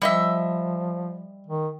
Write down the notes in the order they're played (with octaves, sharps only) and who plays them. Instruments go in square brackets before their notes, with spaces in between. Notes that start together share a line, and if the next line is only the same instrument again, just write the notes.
[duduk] F3 [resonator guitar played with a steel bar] G3 D#5 E5
[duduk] D#3